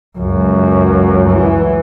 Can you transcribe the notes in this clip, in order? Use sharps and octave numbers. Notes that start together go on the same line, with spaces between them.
C#2 F#2
E3